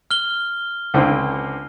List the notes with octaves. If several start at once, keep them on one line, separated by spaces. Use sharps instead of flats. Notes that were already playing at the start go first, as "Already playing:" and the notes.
F6 G7
C#2 D3 C4